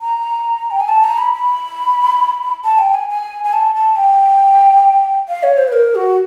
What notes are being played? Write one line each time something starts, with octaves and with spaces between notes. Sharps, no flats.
A#5
G5
G#5
A5
A#5
B5
B5
A5
G5
G#5
G#5
G#5
A5
A5
G5
F5
C#5
C5
B4
A#4
F#4